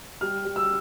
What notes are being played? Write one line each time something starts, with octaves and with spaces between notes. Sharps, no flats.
G3 F6
G3
E6